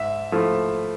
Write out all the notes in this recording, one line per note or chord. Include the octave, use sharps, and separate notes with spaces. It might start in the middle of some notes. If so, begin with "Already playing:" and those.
Already playing: G#2 E5
F3 A3 E4